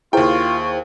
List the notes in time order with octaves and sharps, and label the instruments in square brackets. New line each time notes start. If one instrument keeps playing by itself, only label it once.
[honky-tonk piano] D#2 G5 [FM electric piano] E4 G#4 C5 [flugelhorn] F4 [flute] C#6